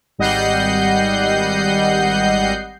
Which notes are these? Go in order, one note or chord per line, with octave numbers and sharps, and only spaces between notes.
G#1 G3 D#5 F#5 G6 C7